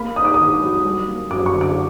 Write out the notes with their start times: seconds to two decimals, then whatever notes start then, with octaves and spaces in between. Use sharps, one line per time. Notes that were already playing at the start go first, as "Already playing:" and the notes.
Already playing: A#3 B5
0.16 D#4 D#6
0.25 D6
0.34 D#3 D#6
0.62 F#3
0.85 G3
1.08 A#3
1.30 F#2 D6
1.46 C#6
1.53 D3
1.61 D6